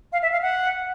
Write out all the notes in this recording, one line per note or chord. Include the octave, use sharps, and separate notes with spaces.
F5
E5
F5
F#5